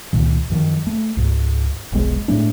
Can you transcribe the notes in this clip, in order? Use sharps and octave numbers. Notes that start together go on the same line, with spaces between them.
C#2 A#2 D#3
F#2 D#3 F3
A3
C#2 G#2
F1 B1 B2 G#3
A2 G#3 A3 D4